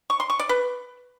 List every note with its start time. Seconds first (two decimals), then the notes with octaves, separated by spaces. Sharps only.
0.10 C#6
0.20 C6
0.30 C#6
0.40 D5
0.49 B4